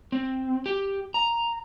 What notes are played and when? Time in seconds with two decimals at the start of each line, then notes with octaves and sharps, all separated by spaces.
0.12 C4
0.66 G4
1.14 A#5